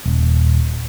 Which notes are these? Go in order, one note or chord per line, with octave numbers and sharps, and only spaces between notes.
D#1